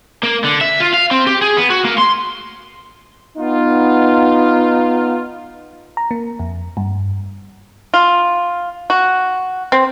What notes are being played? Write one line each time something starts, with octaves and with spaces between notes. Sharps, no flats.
A#3
D3
E5
F4
F5
C4
G4
G#4
B3
F#4
A#3
C6
B3 D#4 F4
A#5
A#3
F2
G2
F4
F#4
C4